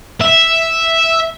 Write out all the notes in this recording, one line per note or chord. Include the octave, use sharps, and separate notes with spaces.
E5